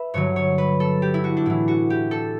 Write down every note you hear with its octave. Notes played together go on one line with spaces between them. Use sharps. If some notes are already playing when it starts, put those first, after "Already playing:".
Already playing: B4 E5
G2 D3 F#3 C#5
C#5
B4
A4
G4
E4
F#4
D4
A2 E3 E4
F#4
G4
A4